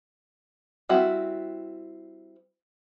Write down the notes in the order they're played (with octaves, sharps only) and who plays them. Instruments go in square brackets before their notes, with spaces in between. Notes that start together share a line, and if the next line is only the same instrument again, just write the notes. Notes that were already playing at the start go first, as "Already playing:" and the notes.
[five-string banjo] G3 C4 E4 F#4